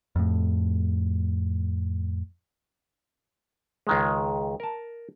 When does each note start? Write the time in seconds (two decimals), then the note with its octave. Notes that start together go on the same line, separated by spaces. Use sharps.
0.16 F2 A2
3.87 C#2 D#3 G#3
4.60 A#4 A5